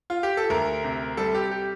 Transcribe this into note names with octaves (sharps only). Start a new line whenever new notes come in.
F4
G4
A4
D2 A#4
C3
G3 A4
G4
G4